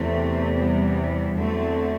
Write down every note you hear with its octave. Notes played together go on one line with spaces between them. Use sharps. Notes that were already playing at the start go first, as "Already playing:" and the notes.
Already playing: E2 C3 E3 A3 C4
G3 B3
E2 D3 F#3 A3 C4